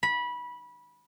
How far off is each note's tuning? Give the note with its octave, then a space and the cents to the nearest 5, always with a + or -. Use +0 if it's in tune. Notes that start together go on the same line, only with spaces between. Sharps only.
B5 -20